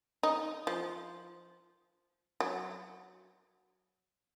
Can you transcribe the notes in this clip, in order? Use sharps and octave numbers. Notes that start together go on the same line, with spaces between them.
D#4
F3
F#3